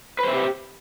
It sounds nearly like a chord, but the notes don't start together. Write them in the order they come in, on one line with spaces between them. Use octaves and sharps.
B4 C5 E5 G4